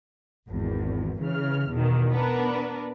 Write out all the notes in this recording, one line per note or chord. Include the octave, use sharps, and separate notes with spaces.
G#1 E2
C#3 E3 F6
E2 B2 D#3
B3 D4 A#4 B4